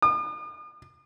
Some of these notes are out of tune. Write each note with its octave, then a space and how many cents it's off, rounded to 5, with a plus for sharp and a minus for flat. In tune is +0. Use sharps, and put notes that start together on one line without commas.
D#6 -45